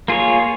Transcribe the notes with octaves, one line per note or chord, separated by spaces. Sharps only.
A#3 F4 G#4 C#5